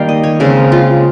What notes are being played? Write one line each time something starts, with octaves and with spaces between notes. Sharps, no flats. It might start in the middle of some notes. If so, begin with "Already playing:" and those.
Already playing: D#3 G3 A#3 F5 G5
D#5
C#5
C#3 G#3 C4 A#4
F4